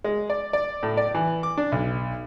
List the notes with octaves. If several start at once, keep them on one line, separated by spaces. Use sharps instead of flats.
G#3
D5
D5
A2
D5
E3
D6
D4
B1